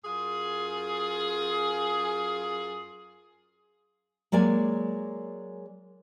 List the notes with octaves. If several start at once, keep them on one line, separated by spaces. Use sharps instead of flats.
F#2 F4 G#4
F#3 G#3 A#3 D5 G#5